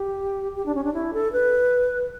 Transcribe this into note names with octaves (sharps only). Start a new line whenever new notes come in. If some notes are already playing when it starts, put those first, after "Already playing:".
Already playing: G4
G4
D4
C#4
D4
E4
A4
B4